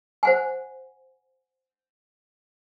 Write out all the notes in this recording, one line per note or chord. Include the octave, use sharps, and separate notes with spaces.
C5 F#5 G#5